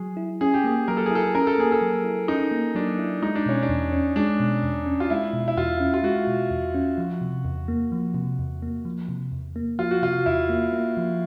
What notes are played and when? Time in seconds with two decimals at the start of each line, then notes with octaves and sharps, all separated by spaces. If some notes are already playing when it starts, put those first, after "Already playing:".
Already playing: F#3 G#4
0.17 E4
0.41 C#4 G#4
0.54 G4
0.64 A#3 G#4
0.88 F#3 A#4
0.97 A4
1.06 G#4
1.11 E4 A4
1.35 C#4 A#4
1.47 A4
1.58 A#3 G#4
1.72 A4
1.81 F#3
2.04 E4
2.28 C#4 D#4
2.51 A#3
2.75 F#3 D4
2.99 E4
3.22 G#3 D#4
3.35 D4
3.46 B2 C#4
3.63 D4
3.69 E2
3.92 C#4
4.16 G#3 D4
4.40 B2
4.63 E2
4.86 C#4
5.00 F4
5.10 G#3 E4
5.33 B2
5.48 E4
5.57 E2 F4
5.80 C#4
5.94 F4
6.03 G#3 F#4
6.27 B2
6.50 E2
6.74 C#4
6.98 F3
7.21 C3
7.45 E2
7.68 A#3
7.92 F3
8.14 C3
8.39 E2
8.62 A#3
8.85 F3
9.08 C3
9.32 E2
9.56 A#3
9.79 F3 F4
9.91 F#4
10.02 C3 F4
10.26 E2 E4
10.49 A#3
10.72 A#3
10.97 F3